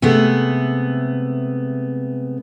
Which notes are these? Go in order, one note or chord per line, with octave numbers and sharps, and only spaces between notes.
C3 G#3 A3 B3